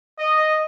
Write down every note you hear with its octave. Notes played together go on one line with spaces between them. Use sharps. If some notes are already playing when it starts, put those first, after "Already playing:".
D#5